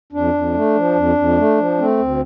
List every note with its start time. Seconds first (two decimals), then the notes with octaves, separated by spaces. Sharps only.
0.12 F2 D4
0.33 F2
0.54 A3
0.75 F3
0.95 F2
1.16 F2
1.37 A3
1.58 F3
1.78 A3 C4
1.98 D2